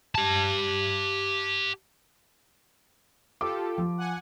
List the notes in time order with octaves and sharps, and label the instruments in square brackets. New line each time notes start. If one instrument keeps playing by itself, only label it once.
[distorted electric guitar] G4 A5
[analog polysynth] F4 G4 A4 [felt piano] D6
[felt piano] F3
[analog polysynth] F#5 G#5